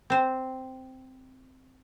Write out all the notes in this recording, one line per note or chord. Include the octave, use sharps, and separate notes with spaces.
C4 C5